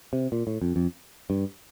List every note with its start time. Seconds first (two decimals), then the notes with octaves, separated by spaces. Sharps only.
0.13 C3
0.32 A#2
0.47 A2
0.62 F2
0.76 F2
1.30 G2